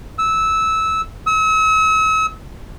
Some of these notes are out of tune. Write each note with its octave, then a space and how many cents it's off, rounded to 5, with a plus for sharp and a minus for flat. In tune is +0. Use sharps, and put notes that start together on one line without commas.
E6 -15
E6 -40